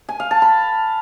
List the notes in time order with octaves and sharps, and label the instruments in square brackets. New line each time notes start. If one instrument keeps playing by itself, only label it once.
[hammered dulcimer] G#5
F5
A5
B5